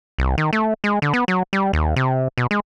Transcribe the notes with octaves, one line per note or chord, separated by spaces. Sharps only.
C2
D#3
A3
G#3
D3
B3
F#3
G3
D#2
C3
B2
G#3